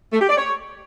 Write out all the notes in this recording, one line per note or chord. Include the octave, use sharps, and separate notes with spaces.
A3
G4
D5
C#5